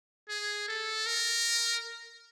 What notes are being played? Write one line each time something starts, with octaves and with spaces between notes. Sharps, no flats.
G#4
A4
A#4